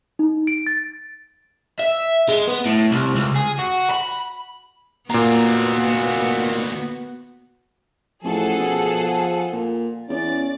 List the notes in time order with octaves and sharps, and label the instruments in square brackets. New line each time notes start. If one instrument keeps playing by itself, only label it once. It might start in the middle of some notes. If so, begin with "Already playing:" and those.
[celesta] D#4
D7
A6
[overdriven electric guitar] E5
G#3
B3
A2
C2
C#2
G#4
F#4
B5
[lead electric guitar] D2 A#3 [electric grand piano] A#2 A#5 [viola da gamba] B3 F#4
[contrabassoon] A1 [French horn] F3 [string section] G#4 A4 F#5
[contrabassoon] B2
A#2
[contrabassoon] E2 [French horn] C#4 [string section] D5 A6